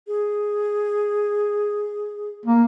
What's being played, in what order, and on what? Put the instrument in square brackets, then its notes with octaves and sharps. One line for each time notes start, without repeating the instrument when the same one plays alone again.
[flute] G#4
[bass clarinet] A#3